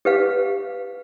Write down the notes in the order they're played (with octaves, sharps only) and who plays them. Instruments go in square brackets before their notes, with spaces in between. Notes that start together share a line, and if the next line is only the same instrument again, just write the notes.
[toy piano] G4 B4 F5